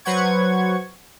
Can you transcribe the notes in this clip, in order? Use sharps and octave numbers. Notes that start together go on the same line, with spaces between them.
F#3 B4 C5 F#5 C#6 G#6